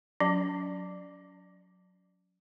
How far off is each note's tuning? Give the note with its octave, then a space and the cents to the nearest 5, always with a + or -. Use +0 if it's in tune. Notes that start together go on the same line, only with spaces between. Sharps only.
F#3 -20 C#4 +40